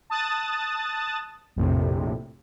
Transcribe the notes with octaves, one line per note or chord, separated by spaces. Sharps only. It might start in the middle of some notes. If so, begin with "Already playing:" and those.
A5 D#6 F#6 A6
A#1 F2 A2 C3